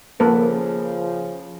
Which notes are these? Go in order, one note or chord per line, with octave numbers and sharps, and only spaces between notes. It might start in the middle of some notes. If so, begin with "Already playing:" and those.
C#3 F3 A#3 A4 B4